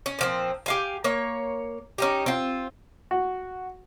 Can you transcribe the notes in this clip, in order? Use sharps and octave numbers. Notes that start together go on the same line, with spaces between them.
C#4
A#2 F3 C4
G4 F5 G#5
A#3 C#5
C#4 D#4 G4
C4 F4
F#4